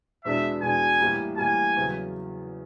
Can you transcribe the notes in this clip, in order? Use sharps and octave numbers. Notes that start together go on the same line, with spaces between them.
E2 B2 G#3 B3 D4 E5
E2 B2 G#3 B3 D4 G#5
A2 E3 G3 A#3
A2 E3 G3 A#3 G#5
E2 C#3 F#3